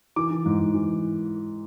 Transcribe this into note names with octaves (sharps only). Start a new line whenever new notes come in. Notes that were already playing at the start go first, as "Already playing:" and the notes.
E3 D6
E3
G#2
G#2
E3